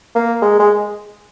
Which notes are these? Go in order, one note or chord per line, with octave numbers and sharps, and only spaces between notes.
A#3
G#3
G#3